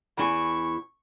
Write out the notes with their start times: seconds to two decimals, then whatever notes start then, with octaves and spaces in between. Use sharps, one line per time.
0.18 E2 E4 G#5 C#6